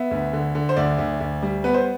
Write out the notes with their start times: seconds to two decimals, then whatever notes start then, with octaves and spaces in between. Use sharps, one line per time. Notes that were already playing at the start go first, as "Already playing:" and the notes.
Already playing: B3 E5
0.11 D2
0.33 D3
0.55 D3
0.69 C5
0.77 D2 D5
0.98 D2
1.20 D2
1.42 G3
1.64 B3 B4
1.74 C5